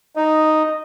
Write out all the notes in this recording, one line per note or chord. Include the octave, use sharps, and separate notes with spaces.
D#4 D#5